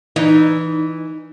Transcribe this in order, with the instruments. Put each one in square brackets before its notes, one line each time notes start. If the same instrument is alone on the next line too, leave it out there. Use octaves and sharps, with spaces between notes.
[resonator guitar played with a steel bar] E3 [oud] D#4